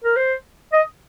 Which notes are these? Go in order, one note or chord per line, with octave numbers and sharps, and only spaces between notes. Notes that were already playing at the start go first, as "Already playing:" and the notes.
A#4
C5
D#5